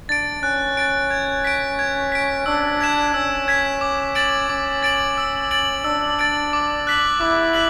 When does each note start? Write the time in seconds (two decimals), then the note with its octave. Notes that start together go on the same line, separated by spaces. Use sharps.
0.09 D4 A6 D7
0.42 C#4 F#6
0.77 A6 D7
1.10 G#6
1.44 B6 D7
1.79 G#6
2.12 B6 D7
2.46 D4 E6
2.80 G#6 B6 E7
3.14 C#4 E6
3.48 G#6 B6 E7
3.81 D6
4.15 A6 D7 F#7
4.49 C#4 D6
4.83 A6 D7 F#7
5.18 E6
5.51 A6 D7 F#7
5.84 D4 E6
6.19 A6 D7 F#7
6.53 D6
6.87 F#6 B6 F#7
7.20 E4 D6
7.54 F#6 B6 F#7